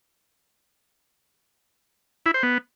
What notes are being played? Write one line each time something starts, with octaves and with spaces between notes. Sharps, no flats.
E4
C5
B3